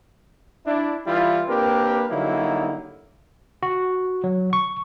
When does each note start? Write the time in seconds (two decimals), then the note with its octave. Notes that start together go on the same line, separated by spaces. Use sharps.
0.66 D4 E4
1.06 E3 G3 E4 F4
1.48 A#3 C4 D4 G4 A#4 B4
2.10 D3 F#3 G3 A#3 D#4 E4
3.63 F#4
4.24 F#3
4.53 C#6